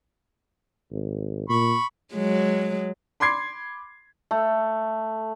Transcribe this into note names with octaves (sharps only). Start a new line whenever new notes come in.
G#1
A#2 B5 C#6
F#3 G#3
B5 C6 D6 G#6 C7
A3